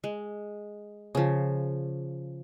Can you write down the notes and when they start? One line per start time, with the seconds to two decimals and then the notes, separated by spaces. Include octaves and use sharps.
0.04 G#3
1.15 C#3 F3